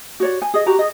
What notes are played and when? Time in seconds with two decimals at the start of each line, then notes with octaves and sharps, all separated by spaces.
0.20 F#4 C#5 D5
0.42 G#5
0.54 G#4 D#5
0.66 F#4 G4 A#5
0.79 G#4 D#5